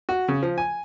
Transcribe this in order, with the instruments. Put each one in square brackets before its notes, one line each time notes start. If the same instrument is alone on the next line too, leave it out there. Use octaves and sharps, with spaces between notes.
[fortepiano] F#4
C#3
F3
G#5